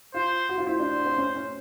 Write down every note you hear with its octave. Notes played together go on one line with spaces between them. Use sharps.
F4 C5
F#4
F4
E4 C5
D4
C4
C#4
C#4